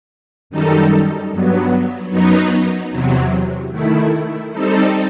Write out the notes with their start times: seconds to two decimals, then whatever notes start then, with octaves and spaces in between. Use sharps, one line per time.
0.50 F#2 D#3 G3 D#4 A4
1.30 G2 F#3 B3
2.10 F#2 F#3 B3 D#4
2.91 E2 C3 F#3
3.71 D#3 A3 E4
4.51 G3 C4 D#4 A4